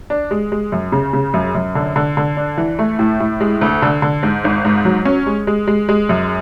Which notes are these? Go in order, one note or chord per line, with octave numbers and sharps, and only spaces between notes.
D4
G#3
G#3
F#2
C#3
C#3
F#2
F#2
D3
D3
D3
D4
E3
A3
A2
A2
G#3
D2
D3
D3
G#2
G#1
G#2
F#3
C#4
G#3
G#3
G#3
G#3
F#2